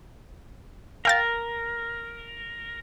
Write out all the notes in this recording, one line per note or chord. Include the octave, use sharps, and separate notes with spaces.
A#4 F5 G5 A6